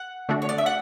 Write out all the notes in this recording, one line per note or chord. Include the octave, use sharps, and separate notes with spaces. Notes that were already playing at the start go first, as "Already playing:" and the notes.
Already playing: F#5
D3 A3 D4 F#4
C#5
D5
E5
F#5